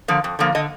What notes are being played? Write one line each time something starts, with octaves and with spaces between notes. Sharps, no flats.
D3 F3 A#3
F2
D3 F3 A#3
D3 D#5